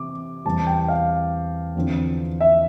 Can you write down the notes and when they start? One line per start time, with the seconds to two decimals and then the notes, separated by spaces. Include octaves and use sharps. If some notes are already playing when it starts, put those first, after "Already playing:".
Already playing: C3 E3 D6
0.45 E2 C3 G3 C4 A5
0.67 G5
0.88 F5
1.75 E2 D3 F3 C4
2.40 E5